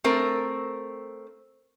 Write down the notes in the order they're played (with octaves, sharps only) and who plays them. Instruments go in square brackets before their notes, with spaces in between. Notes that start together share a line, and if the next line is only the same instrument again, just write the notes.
[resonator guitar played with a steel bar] A3 C4 A#4